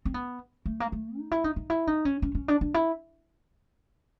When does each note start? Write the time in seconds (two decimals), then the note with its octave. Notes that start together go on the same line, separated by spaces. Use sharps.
0.05 C4
0.14 B3
0.66 A3
0.80 A#3
0.92 A3
1.18 D#4
1.31 E4
1.44 D#4
1.56 D#4
1.70 E4
1.87 D#4
2.05 C#4
2.22 C#4
2.35 C#4
2.48 D4
2.61 D4
2.74 E4